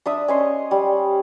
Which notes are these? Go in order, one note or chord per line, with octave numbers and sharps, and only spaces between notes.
D4 E5 D#6
C#4 D#5 C6
G3